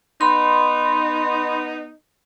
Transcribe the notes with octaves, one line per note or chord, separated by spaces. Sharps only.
B3 D#4 B5 C6